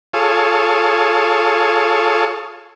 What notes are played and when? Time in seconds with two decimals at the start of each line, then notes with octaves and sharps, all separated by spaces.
0.13 F4 G#4 A4 C#5